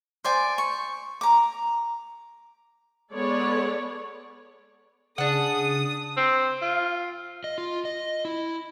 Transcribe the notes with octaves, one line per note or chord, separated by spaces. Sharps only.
C5 D5 G#5
C#6
A#5 D6
G#3 B3 G#4 A4 C#5 D5
C#3 D4 G#4 F#5 D#6
C4
F4
D#5
F4
D#5
E4